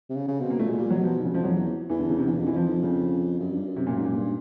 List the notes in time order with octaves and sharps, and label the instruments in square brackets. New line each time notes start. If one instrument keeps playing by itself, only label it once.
[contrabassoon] C3
C#3
C#3
[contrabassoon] B2 [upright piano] C4
[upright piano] A#3
[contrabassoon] A#2 [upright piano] A3
[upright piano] G#3
[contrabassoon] A#2 [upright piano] G3
[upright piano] F#3
[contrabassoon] B2
[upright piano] F3
D#3
C#3
[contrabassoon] F2 [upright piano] F3
[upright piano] F#3
[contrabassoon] E2
[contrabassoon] E2 [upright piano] E3
[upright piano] D3
C#3
C3
[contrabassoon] E2 [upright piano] D3
[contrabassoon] F2 [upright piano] D#3
[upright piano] E3
[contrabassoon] F2 [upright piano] F3
[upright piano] D#3
C#3
[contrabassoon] F#2
G2
F#2
[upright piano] C3
A#2
G#2
A#2
[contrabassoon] G2